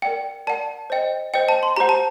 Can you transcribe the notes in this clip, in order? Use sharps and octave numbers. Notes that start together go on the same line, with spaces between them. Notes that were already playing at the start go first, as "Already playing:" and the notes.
A#4 D5 F#5 G5
A#4 D5 F#5 A5
C5 D#5 G5
C5 D#5 G5
A5
C6
G4 C5 F#5 A#5
A5